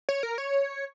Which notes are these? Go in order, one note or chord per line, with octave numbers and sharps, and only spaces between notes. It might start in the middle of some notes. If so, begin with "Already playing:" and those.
C#5
A#4
C#5